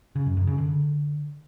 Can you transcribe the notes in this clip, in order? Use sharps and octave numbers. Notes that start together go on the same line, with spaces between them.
C#3
F#2
F#2
C#3
D3